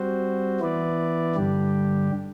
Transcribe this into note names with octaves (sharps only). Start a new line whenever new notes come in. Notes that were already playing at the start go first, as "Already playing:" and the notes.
Already playing: G3 C4 F#4 C5
E3 B3 E4 B4 D5
G2 D3 G3 D4 G4